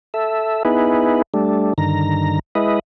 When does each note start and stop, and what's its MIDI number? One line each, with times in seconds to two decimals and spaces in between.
0.14 0.63 69
0.14 0.63 76
0.65 1.22 59
0.65 1.22 63
0.65 1.22 64
0.65 1.22 68
0.65 1.22 71
1.34 1.73 55
1.34 1.73 57
1.34 1.73 62
1.78 2.39 43
1.78 2.39 50
1.78 2.39 51
1.78 2.39 82
2.55 2.79 56
2.55 2.79 64
2.55 2.79 71
2.55 2.79 75